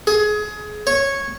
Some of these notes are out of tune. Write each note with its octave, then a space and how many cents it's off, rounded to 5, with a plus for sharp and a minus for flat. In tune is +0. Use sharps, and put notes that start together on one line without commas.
G#4 +25
C#5 -10